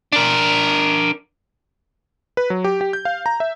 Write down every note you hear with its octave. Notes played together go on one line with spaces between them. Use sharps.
D4 A#4
B4
F#3
G4
G4
G6
F5
A#5
E5